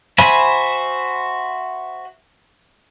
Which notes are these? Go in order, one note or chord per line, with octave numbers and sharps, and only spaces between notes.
F#4 C5 E5 G#5 B5